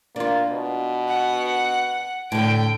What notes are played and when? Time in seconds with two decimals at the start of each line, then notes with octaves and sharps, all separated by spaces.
0.16 A#3 D4 F4
0.51 B2
1.09 F#5
2.32 A2 D3 G5 D7